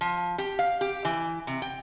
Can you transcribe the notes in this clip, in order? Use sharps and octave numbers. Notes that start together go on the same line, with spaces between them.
F3
G4
F5
G4
E3
C3
G5